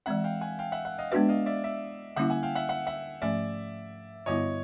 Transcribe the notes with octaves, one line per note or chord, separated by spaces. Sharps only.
E3 G#3 C4 E5 F#5
F5 G5
F#5 G#5
F5 G5
E5 F#5
E5 F#5
D#5 F5
G#3 B3 D4 F#4 B4 D5 E5
D#5 F5
D5 E5
D5 E5
D3 G3 A#3 C#4 E4 E5 F#5
F#5 G#5
F5 G5
E5 F#5
E5 F#5
E5 F#5
G#2 F3 A3 C#4 D5 E5
G2 D3 G3 B3 E4 C#5 D#5